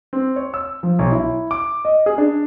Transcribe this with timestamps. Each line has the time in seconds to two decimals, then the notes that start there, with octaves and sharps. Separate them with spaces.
0.13 C4
0.36 C#5
0.54 E6
0.83 F3
0.99 B1
1.12 E4
1.51 D6
1.85 D#5
2.06 G#4
2.18 D4